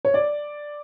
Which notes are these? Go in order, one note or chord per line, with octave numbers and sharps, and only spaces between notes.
C#5
D5